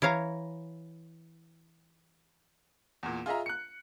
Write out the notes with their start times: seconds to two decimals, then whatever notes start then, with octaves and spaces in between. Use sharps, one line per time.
0.02 E3 C#5 F5 A#5
3.03 E2 A#2
3.26 F4 G#4 D#5 E5 A#5
3.46 F#6 C#7